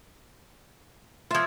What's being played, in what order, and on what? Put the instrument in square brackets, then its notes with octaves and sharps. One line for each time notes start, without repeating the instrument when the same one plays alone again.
[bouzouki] F3 E5 [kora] F4 C#5